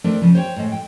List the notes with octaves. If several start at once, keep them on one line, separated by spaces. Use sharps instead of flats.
A3 C4 D4 A#4
C#3 F3
C5 C#5 F#5 G5
A2 G#3
G5